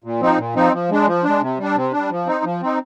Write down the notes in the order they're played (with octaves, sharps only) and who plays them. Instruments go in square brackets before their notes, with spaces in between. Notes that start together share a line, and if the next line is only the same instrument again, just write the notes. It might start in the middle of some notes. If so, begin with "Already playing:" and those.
[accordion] A#2
F3 C4 D#4
A#2
F3 C4 D#4
F3
G#3 D4
F3
G#3 D4
C3
G3 D4
C3
G3 D4
F3
C4 D#4
F3
C4 D#4